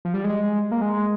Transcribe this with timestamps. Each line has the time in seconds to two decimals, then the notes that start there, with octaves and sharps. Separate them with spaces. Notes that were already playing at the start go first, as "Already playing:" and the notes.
0.05 F3
0.14 G3
0.24 G#3
0.71 A#3
0.81 G#3